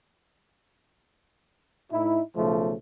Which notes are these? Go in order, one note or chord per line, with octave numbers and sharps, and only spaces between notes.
A2 D#4 E4
B1 C#3 F3 A3